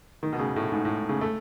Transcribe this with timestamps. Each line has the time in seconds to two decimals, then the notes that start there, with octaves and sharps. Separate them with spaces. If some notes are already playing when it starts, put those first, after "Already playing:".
0.23 D#3
0.33 B2
0.39 C#3
0.56 A2
0.72 G#2
0.85 A2
1.09 C#3
1.21 A3